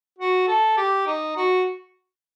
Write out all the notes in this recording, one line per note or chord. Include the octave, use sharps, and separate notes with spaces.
F#4
A4
G4
D#4
F#4